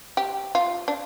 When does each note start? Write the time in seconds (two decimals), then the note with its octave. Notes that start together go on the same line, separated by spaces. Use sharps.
0.17 G4
0.55 F4
0.88 D4